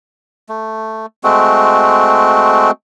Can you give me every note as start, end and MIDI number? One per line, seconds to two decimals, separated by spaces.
0.49 1.06 57
1.24 2.71 56
1.24 2.71 57
1.24 2.71 60
1.24 2.71 66